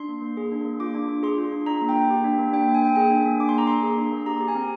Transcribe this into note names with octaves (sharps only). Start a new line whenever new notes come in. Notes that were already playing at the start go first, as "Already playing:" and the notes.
Already playing: D4 C6
A#3
A#3
G#4
D4
A#3
F4 D6
D4
D4
G#4 C6
F4
D4
D4 A#5
A#3
G5
A#3
G4
D4
A#3
D4 G5
A#3
G#5
A#3 G5
G#4 G#5
D4
A#3
D4 D6
C6
A#3 A#5
A#3 C6
G#4
D4
A#3
G4 A#5
G4
G#5
C4